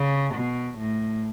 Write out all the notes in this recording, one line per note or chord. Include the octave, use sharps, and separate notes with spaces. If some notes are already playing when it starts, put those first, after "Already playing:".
Already playing: C#3
B2
A2